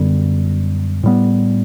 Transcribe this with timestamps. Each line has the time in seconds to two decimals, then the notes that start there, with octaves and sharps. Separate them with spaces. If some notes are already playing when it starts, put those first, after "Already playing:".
Already playing: F#2 D3 G3 B3
1.04 A2 G3 B3